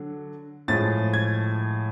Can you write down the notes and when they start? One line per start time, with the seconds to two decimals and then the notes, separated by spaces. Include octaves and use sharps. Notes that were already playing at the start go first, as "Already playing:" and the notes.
Already playing: D3 F#3
0.68 A2 F3 G#3 A6
1.14 G#6